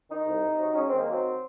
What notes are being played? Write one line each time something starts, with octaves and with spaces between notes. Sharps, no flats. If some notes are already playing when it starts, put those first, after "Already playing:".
D#3 D#4
C2
C3
F#3
G#3 C#4
D#3 C4
A#3
F#3 C4